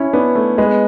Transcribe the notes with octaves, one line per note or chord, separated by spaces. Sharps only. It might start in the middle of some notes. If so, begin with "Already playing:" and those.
Already playing: C#4 E4
B3 D4
A3
G#3 B3